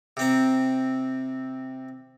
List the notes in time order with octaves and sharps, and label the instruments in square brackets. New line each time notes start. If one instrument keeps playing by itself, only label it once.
[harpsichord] C3 C4 A#5